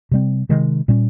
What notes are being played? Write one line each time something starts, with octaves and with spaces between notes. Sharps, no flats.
C3 G3 C4
C3 D#3 G#3
A#2 G3 C#4